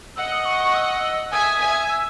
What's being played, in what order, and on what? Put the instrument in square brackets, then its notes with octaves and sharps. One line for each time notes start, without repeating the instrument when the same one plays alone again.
[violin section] D#5 F#5 [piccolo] E6
[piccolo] D#6
C#6
C#6
E6
[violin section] E5 G#5 [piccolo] D#6
[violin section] E5 G#5
[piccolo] E6